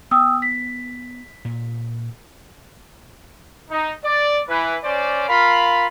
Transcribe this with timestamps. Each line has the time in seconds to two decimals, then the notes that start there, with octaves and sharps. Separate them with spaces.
0.11 B3 G5 D#6 E6
0.42 B6
1.45 A#2
3.71 D#4
4.04 D5
4.49 E3 E4 B4
4.84 C#4 C5 D5
5.29 F4 A#4 F5 B5